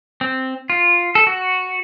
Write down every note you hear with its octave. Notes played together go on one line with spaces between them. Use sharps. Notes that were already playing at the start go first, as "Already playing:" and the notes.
C4
F4
A4
F#4